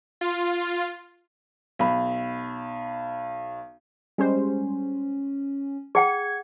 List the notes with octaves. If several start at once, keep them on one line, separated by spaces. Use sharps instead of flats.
F4
B1 B5
G3 G#3 C#4 C5
G#4 F#5 G5 G#6 C#7